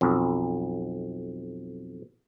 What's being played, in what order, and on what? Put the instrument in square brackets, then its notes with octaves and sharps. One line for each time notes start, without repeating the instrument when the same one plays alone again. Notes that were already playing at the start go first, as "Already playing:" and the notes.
[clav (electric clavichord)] B1 F2